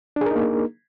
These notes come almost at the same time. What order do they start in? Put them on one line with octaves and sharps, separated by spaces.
D4 G#4 A#4 D#4 A#3